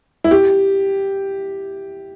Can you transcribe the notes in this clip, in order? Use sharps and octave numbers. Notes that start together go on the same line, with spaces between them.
E4
G4